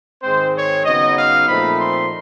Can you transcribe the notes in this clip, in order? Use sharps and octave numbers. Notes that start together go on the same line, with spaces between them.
G#2 D#3 G#3 C4 C5
C#5
C#3 F#3 B3 D#4 D#5
F5
A#2 F3 A3 C4 D#4 B5
C6